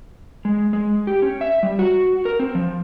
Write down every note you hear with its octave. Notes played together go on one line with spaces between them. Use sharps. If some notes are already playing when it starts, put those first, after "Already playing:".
G#3
G#3
G4
C#4
E5
G3
F#4
A#4
C4
F3